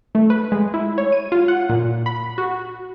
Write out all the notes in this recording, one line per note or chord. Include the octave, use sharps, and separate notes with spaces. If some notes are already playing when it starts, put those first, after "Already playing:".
A3
B4
G#3
E4
C#5
D#7
F4
F#5
A#2
B5
F#4